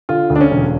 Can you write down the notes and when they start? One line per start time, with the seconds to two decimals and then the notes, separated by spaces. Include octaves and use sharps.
0.09 D3 F4
0.30 D2
0.36 D4
0.41 C#4
0.51 E1